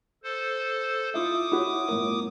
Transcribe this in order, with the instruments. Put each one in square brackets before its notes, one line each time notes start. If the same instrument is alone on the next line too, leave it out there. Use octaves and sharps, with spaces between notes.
[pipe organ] A4 C5
[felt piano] E4 F4 E5 [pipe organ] D6 D#6
[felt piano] E4 F#4 C#5
G1 A2 A#4